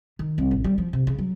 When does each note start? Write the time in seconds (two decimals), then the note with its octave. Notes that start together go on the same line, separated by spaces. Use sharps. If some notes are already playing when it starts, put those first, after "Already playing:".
0.19 D#3
0.38 C2
0.51 A1
0.64 G3
0.78 F3
0.93 C3
1.07 C#3
1.19 F#3